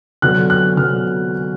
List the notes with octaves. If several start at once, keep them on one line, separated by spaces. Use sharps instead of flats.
D3 F#3 B3 F#6
F#6
D3 F#3 B3 F6